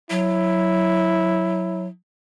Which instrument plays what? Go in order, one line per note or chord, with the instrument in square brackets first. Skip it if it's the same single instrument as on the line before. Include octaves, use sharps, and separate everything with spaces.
[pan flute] F#3 [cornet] E4